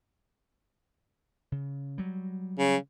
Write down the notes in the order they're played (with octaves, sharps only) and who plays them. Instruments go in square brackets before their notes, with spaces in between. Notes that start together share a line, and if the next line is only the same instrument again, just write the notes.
[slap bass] C#3
F#3 G3
[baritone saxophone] C#3